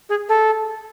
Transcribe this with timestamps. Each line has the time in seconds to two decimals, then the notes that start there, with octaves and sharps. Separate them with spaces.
0.09 G#4
0.29 A4